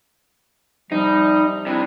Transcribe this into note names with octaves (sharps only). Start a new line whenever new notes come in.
C3 F3 G3 D#4
C3 G3 D4 E4